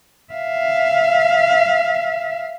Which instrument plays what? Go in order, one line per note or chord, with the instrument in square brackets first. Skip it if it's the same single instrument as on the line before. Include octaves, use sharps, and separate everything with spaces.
[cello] E5 F5